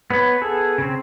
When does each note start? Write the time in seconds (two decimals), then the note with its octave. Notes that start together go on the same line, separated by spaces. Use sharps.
0.11 B3 B4 C#5 B5
0.42 B3 G#4 A4
0.78 C#3 C4